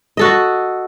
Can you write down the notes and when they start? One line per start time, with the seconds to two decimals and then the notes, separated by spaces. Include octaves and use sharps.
0.17 F#4 A4 D#5